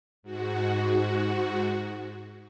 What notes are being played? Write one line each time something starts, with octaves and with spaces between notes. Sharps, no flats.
G#2 F#4